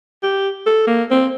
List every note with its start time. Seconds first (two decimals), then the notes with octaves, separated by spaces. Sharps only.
0.23 G4
0.66 A4
0.87 A#3
1.11 C4